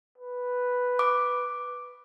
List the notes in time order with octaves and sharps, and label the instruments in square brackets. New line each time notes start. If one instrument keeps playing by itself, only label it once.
[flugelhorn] B4
[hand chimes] D6